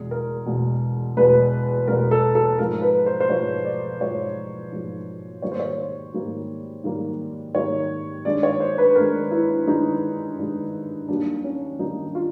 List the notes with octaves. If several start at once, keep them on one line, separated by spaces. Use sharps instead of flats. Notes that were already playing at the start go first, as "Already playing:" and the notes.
Already playing: E2 B2 G#3 G#4
A#4
E2 B2 G#3
E2 B2 G#3 B4
E2 B2 G#3 A#4
A4
A4
G#2 F3 G#3 A#4
B4
C5
C5
G#2 F3 G#3 C#5
D5
G#2 F3 G#3 C#5
G#2 F3 G#3
G#2 D#3 G3 A#3 C#5
C5
C#5
C5
G#2 D#3 G3 A#3
G#2 D#3 G3 A#3
G#2 D#3 G3 A#3 C#5
G2 D#3 G#3 D5
C#5
C5
B4
G2 D#3 G#3 A#4
E4
G2 D#3 G#3 D#4
G2 D#3 G#3
D#2 D#3 G3 A#3 D4
C#4
D#2 D#3 G3 A#3 D#4
F4